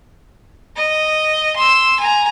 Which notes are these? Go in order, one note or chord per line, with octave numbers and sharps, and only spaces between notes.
D#5
C6 E6
G#5 A#5